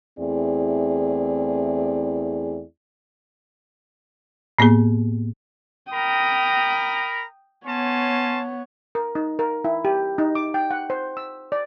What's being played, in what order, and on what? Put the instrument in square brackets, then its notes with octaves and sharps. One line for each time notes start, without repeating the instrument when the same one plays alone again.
[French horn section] E2 A3 C4 E4 G#4 D5
[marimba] A2 A#3 B3 G#4
[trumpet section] A#4 A#5 B5 [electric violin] G5 D#6
[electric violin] B3 C#5 [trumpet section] C#4 A5 C6
[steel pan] A#4
D#4
A#4
E4
G4
D#4
D6
G5
F#5
C5
E6
D5